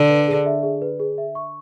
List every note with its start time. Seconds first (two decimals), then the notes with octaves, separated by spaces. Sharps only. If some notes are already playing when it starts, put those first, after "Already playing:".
Already playing: D3
0.10 B4
0.28 G#4
0.46 E5
0.63 G#4
0.82 B4
1.00 G#4
1.18 E5
1.35 C#6